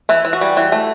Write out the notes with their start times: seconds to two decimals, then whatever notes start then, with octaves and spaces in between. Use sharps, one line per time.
0.09 E3 E4
0.25 E3
0.33 F#4
0.41 G3
0.57 E3
0.72 A3